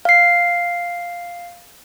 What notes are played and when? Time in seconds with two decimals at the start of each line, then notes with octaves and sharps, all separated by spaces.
0.05 F5 C7